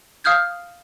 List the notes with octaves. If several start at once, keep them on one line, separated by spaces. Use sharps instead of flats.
F5 D#6 F6 G6 G#6